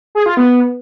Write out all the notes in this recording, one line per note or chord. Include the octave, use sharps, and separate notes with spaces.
G#4
F4
B3